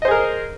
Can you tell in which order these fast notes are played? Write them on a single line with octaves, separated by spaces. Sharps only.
D#5 C5 G#4 A#4